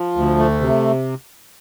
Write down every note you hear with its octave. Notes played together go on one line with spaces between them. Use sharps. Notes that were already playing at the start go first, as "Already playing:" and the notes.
Already playing: F3
D2
A3
C3